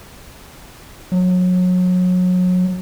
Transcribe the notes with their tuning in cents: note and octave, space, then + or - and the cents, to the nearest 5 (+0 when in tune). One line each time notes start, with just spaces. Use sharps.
F#3 -30